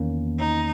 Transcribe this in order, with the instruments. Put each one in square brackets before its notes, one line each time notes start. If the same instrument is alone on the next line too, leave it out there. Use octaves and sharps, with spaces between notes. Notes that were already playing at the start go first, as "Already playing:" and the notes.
Already playing: [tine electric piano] E2 D#3 A#3 C#4
[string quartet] D#4